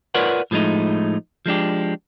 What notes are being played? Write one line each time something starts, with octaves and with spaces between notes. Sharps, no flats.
F4 A#4 B4 C#5 D5 F#5
A2 F3 G#3 A3 D#4
F3 G#3 D4 G4